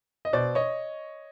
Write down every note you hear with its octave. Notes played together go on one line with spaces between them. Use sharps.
D#5
B2 C5 D5
C#5 D#5